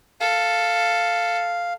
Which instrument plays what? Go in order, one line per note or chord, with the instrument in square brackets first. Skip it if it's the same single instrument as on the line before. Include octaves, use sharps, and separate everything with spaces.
[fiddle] A4 [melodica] F5